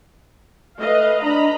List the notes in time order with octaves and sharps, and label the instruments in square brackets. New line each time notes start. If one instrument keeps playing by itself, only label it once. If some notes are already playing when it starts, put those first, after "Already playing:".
[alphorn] A3 [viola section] B4 D#5 F5
[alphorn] D4 [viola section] D#5 A#5 B5